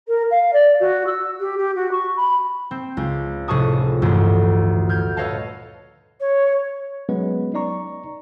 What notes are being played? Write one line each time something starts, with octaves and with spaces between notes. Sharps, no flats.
A#4
F5
D5
F#4
E6
G4
G4
F#4
C#6
B5
C4
C#2
F1 A2 G#4 A5 C#6 D#6
A1 D2 G2 A#2
F6 G6 G#6
A4 B4 C#5 D#5 F5 A5
C#5
F#3 G#3 B3 C#4 B4
D#4 D5 A#5 C#6